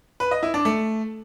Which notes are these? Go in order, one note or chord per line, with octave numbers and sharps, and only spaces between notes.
B4
D#5
E4
D4
A3